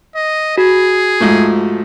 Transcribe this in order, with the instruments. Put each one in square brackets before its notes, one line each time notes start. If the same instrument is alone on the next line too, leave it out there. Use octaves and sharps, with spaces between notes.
[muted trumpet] D#5
[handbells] F#4 [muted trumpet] G#4
[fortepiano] G#2 F3 A3